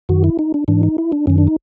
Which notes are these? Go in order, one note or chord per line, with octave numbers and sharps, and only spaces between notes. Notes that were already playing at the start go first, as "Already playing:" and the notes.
F#2 D#3 F#4
E4
D#4
D4
G#2 E3 D4
D#4
E4
D4
F#2 D#3 C#4
D4
D#4